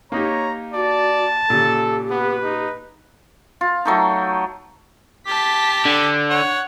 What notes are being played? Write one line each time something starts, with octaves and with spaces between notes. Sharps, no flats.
A#3 D#4 G4 C#5 A#5
F#4 D5 A5
A#2 C#3 G4 A4
B3 B4
D#4
F4
F#3 A3 D#4
G4 A5 B6
D3
C#5 F#5